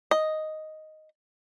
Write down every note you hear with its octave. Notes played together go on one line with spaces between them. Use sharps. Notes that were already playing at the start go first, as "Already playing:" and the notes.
D#5